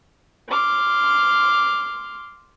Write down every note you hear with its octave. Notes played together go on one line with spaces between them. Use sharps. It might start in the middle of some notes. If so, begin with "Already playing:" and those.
C6 D6 F6